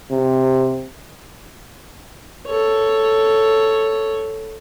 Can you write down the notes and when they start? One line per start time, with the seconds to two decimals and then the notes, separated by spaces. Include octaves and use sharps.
0.12 C3
2.47 A4 C#5